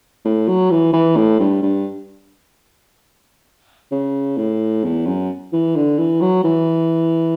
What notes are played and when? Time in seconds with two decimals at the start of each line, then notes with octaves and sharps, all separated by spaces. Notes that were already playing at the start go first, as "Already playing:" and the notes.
0.25 A2
0.48 F#3
0.71 E3
0.93 E3
1.17 A2
1.40 G2
1.63 G2
3.91 C#3
4.37 A2
4.84 E2
5.07 F#2
5.53 E3
5.76 D3
5.99 E3
6.21 F#3
6.44 E3